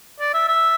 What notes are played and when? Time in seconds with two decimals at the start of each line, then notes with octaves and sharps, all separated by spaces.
0.20 D5
0.34 E5
0.48 E5